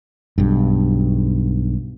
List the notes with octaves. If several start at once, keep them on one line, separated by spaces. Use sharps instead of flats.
B1 G2